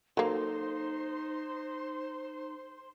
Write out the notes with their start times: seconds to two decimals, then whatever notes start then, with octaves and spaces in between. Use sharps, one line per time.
0.17 F#3 A#3 D#4 A4 C5 C6